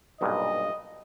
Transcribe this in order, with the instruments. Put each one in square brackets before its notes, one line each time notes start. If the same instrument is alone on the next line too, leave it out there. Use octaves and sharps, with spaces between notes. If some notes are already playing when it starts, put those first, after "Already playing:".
[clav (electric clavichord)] B1 G2 A#2 [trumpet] D#5